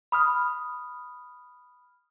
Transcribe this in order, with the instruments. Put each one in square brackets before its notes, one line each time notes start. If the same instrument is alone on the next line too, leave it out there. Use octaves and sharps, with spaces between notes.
[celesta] B5 D#6 F6